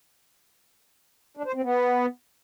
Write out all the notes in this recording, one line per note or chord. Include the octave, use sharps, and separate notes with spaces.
D4
C5
C4
B3